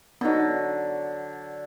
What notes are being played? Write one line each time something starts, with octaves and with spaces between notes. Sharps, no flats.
D3 F#3 B3 D#4